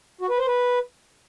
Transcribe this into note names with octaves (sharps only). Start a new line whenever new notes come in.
F#4
B4
C5
B4